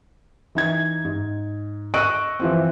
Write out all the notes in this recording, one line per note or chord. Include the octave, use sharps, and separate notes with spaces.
E3 D#4 G#6
G#2
D#5 C#6 E6 F#6 D7 D#7
E3 F3 C4